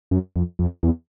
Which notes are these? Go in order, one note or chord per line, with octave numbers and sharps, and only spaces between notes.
F#2
F2
F2
E2